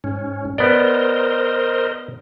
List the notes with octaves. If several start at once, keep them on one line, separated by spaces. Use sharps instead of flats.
G#2 C#4
B3 A#4 C5 D5 D#5